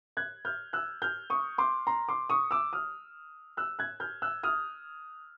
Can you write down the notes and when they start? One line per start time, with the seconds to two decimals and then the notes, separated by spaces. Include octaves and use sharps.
0.17 F#6 G#6
0.45 F6 G6
0.73 E6 F#6
1.02 F6 G6
1.30 C#6 D#6
1.58 C6 D6
1.87 A#5 C6
2.08 C6 D6
2.30 C#6 D#6
2.51 D6 E6
2.73 D#6 F6
3.57 E6 F#6
3.79 F#6 G#6
4.00 F6 G6
4.22 E6 F#6
4.43 D#6 F6